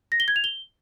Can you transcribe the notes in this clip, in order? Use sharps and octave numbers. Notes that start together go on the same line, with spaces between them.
A#6
G7
G#6
F7
G7